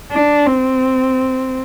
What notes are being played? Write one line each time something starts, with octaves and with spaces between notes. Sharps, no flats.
D4
C4